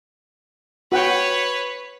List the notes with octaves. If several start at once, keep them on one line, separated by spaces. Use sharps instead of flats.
F#4 B4 C#5 F#5 G5